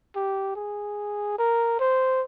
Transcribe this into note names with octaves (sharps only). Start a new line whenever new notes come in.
G4
G#4
A#4
C5